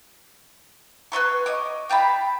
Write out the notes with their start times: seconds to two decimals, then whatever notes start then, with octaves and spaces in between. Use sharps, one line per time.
1.12 B4 C#5 C6 C#6
1.46 D#5 D6
1.89 F5 G5 A5 B5